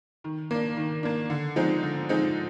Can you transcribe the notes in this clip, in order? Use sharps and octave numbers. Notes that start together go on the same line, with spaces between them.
D#3
A#3 D4
D#3
A#3 D4
D3
F3 G#3 C4 D#4
D3
F3 G#3 C4 D#4